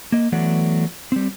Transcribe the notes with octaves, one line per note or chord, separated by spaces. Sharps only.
A#3 D#5
E3 F#3 A3 B3 D5 F#5
G3 C4